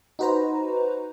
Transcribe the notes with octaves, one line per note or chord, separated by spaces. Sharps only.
D#4 F#4 B4 C5 A#5